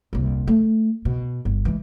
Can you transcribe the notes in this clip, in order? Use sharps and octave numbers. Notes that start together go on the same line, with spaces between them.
D#1 C2
A3
B2
G1
E3 G#3